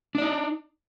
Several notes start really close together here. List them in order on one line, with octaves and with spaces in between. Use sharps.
D4 D5 D#4